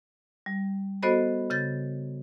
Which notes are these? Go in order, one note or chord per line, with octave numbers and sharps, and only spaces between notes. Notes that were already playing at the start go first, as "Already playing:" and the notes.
G3
B3 F#4 A4 C5 D#5 B5
C#3 G6 A6